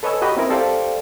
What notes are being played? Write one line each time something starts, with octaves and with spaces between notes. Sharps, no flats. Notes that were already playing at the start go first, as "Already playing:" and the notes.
A4 B4 C#5 D#5 G#5 E6
F#4 G4 D#5 A#5 B5
C4 E4 A#4
G4 A4 C5 D5 F5 G5